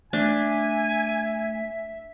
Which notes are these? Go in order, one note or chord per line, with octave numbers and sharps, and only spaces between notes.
A3 D4 E5 G#5